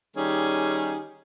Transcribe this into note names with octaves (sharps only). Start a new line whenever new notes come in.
D#3 G3 C#4 G4 G#4